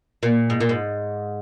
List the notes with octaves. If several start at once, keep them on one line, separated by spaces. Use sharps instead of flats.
A#2
G#2
A#2
G#2